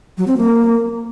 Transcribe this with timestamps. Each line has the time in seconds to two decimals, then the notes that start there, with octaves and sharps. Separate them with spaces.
0.18 F#3
0.28 C4
0.37 A#3